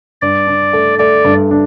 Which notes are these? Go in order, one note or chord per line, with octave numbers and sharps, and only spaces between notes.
G2 D5
D4
A3
A3 D5
G2
D4